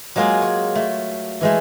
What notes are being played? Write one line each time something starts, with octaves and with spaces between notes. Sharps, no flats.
F#3 G#3 A#3 F4 G#4
C#5
A3
E3 G#3 A3